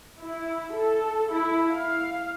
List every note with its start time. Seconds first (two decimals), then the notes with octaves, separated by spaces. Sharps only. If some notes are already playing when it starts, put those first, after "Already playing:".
0.19 E4
0.74 A4
1.30 E4
1.71 F5